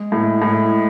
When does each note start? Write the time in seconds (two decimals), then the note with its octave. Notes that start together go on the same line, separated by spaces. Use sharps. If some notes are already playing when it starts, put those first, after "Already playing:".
Already playing: G#3
0.12 A2
0.42 A2